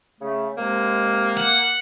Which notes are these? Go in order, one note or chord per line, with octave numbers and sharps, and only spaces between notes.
C#3 A3
C3 G#3 A#3
F#5